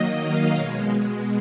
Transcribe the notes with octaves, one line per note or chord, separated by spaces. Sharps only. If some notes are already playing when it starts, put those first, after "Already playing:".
Already playing: D#3 F#3 A#3 D#5
F5
B2 G#3 C#5